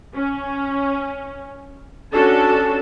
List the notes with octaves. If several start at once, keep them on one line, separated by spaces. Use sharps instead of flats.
C#4
C#4 D4 F#4 A4 A5